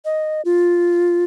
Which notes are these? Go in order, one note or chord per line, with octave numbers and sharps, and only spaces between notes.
D#5
F4